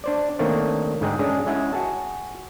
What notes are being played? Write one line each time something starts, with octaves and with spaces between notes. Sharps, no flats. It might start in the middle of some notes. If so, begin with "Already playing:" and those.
D4 C5 D5
D#3 A3 A#3 C4 D4 C#5
G#2 D3 G#3 G#4 F#5 G5
G#3 C#4 D4 G#4
G#3 C#4 E4 E5 F#5
F#4 G#4 A5